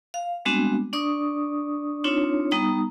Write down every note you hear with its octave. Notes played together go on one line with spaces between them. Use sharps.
F5
G3 G#3 B3 C4 D4 F#4
D4 D5 C#6 D#6
C4 D4 D#4 F4 C#5
G3 B3 D#4 A#5 D#6